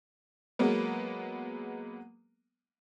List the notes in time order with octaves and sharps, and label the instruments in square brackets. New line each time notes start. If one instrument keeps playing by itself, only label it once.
[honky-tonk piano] F#3 G#3 A#3 B3